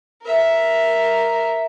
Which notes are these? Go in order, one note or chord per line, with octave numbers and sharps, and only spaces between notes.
A#4 E5